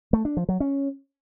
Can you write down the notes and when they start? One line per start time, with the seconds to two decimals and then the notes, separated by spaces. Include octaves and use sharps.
0.13 A3
0.25 D4
0.37 F3
0.49 F#3
0.60 C#4